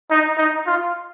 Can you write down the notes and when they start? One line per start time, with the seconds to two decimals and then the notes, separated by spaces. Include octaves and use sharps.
0.10 D#4
0.37 D#4
0.66 F4